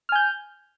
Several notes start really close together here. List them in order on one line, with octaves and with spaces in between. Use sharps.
F6 G#5 G6